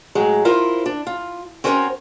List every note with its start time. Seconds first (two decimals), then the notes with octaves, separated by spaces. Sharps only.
0.15 A2 F#3 G#3 G#4
0.45 E4 F4 A#4 C5
0.86 D4
1.07 F4
1.64 C4 C#4 F#4 A#4 C5 C#5